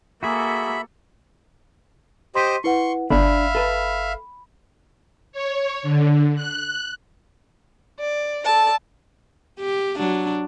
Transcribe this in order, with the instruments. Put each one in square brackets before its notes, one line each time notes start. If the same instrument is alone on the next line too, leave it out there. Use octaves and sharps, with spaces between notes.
[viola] A#3 A4 [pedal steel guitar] F#4 G#4 [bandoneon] E5 B5
[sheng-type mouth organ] G4 C5 D#5 [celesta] C6 B6 D#7
[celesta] E4 B4 F#5 [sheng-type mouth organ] C6 C#6
[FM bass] G1 [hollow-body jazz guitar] D4 [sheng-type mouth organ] E5 F5 [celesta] B5
[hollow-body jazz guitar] A4 B4
[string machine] C#5
D3
F#6
[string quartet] D5
A4 D5 A5
[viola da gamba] G4
F#3 D4